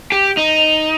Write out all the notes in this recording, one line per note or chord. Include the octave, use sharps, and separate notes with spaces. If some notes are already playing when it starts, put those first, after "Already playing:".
G4
D#4